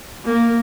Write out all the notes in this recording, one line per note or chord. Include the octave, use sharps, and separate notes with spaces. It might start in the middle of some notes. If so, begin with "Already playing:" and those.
A#3